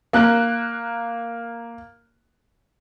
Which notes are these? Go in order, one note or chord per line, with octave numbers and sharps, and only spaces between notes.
A#3 F#6